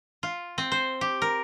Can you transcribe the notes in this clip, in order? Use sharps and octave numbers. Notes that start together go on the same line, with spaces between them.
F4
C4
C5
G4
A#4